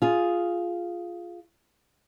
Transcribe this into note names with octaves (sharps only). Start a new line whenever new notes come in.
F4 G#4